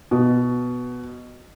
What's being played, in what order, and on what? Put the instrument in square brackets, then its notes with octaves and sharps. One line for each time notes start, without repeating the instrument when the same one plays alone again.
[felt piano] B2